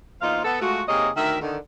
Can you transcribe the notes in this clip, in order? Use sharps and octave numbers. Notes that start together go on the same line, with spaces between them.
E2 A#3 D#4 F4 C5 F5
B3 A4
G#3 A3 F4 F#4
C3 A#3 D#4 G#4 C#5 D#5
D2 D#3 A#4 E5
D3 D#3